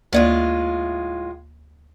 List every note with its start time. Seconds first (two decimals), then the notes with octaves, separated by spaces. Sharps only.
0.13 D2 A2 G#3 A#3 F4 D5